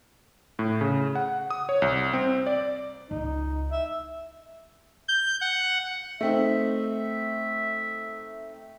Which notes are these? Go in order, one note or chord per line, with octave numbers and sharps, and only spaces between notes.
A2
C#3
F#5
D#6
C#5
C2
C4
D5
C#2 D#4
E5
G6
F#5
A3 C4 D#4 E5